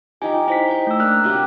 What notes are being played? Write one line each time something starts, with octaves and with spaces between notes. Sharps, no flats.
F3 D#4 G4 G#5
D#4 E4 C5 B6
G5 C#6
A3 E6
A#3 D4 F6 F#6
C3 F#3 G4